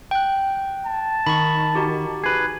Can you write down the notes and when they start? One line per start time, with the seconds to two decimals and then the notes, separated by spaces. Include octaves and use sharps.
0.11 G5 F#6
0.86 A5
1.27 D#3 B5 C#6
1.75 D#4 F#4 G4
2.24 G#4 B4